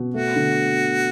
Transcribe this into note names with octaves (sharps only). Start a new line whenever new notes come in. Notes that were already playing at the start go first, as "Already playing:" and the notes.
Already playing: B2
A3 F#4
D3